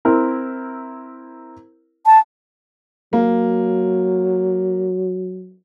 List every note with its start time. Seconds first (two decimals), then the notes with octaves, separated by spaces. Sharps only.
0.05 C4 E4 A#4
2.06 A5
3.13 F#3 A#3